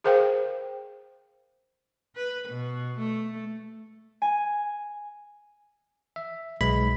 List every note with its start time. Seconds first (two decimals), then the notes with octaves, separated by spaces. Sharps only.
0.04 G#4 A#4 C5 F5 G5
2.16 B4
2.48 B2
2.99 A3
4.22 G#5
6.16 E5
6.61 B1 G#3 B5